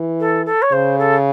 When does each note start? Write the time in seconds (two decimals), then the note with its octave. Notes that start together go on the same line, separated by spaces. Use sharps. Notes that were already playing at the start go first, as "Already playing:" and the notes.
Already playing: E3
0.20 A4
0.46 A4
0.62 C#5
0.72 C#3 C5
0.98 A4